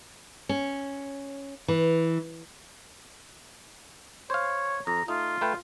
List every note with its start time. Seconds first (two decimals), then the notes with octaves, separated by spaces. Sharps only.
0.49 C#4
1.68 E3
4.30 C5 C#5 F5
4.87 F2 A#5
5.08 A3 D#4 F4
5.41 A3 B4 G5